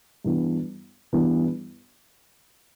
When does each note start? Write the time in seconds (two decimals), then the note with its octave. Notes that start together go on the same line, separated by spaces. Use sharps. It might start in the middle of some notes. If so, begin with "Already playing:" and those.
0.24 G2 E3 B3
1.13 G2 E3 B3